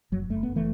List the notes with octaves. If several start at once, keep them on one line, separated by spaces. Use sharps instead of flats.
F#1 F#3
F#1 A3
B3
F#1
E3 A3